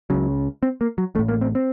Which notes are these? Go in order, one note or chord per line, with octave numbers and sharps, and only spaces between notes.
C#2 C#3 F#3
C4
A#3
F#3
A1 A2 A3
A#3
C4
C4